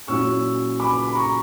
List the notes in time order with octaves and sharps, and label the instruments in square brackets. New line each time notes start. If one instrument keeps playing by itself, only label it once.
[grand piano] A#2 F#3 C#4 E4 C#6 E6
B5 D6
B5
A#5 C#6